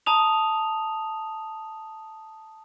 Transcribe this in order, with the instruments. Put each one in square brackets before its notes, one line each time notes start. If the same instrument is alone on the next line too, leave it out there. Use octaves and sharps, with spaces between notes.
[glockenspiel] A5 A#5 D#6 F7